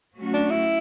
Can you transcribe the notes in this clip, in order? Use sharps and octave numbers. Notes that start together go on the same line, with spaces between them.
F#3 A3 C#4 F#4
D4
E4